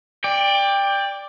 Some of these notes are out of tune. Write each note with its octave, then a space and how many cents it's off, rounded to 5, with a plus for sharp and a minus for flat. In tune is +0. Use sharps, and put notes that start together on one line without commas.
D5 +0 G5 +20